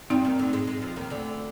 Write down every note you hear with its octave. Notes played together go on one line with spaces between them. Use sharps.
G2 G3 C4 D#4
D#2 D#3
D2 D3
G#2 G#3
G#2 G#3
F2 F3
D#2 D#3
D2 D3